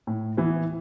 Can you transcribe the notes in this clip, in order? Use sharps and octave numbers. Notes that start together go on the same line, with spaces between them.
A2
E3 B3 E4